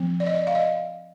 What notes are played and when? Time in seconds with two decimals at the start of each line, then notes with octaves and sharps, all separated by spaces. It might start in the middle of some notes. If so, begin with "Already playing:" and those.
Already playing: F3 C4
0.20 D5
0.26 D#5
0.34 D5
0.47 F5
0.55 D#5